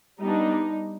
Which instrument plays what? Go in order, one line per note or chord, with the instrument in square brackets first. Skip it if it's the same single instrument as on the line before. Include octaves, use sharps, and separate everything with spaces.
[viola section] G3 B3 D4 D#4